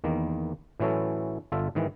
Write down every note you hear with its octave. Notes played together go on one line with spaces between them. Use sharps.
E2 D#3 A#3
A2 E3 F#3 C#4 A4
G1 F4 A4 E5
G#2 D#3 E3